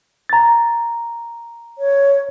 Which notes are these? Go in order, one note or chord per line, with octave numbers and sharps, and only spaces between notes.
A#5 A6
C#5